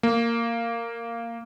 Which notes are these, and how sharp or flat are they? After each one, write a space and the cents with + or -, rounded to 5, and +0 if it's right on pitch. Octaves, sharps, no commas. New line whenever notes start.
A#3 -10